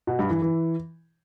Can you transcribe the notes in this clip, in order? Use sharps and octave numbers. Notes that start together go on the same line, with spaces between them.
B2
G2
E3
E3